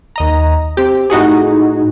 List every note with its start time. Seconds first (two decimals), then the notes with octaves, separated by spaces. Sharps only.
0.16 D#2 D#5 A#5
0.77 C4 G4
1.10 A2 D#4 F#4 G#4